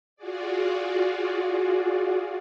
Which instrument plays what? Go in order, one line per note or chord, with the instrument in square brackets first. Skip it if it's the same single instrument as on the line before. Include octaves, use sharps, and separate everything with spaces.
[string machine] F4 F#4 G#4 D5